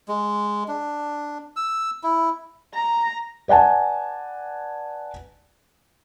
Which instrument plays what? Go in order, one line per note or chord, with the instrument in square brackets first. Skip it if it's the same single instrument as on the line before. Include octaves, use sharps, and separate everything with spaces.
[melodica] G#3
D4
E6
E4
[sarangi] A#5
[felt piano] B4 D5 F#5 G#5 A5